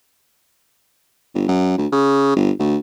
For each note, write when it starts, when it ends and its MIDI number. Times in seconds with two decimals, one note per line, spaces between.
1.35 1.43 31
1.48 1.73 42
1.78 1.87 38
1.92 2.35 49
2.36 2.51 31
2.59 2.77 38